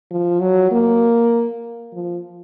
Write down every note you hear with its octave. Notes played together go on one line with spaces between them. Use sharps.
F3
F#3
A#3
F3